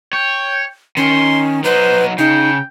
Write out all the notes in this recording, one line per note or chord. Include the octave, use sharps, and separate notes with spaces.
C#5 G5
D#3 C#4 C6
F#3 D#4 B4 C5
C#3 D#4 G5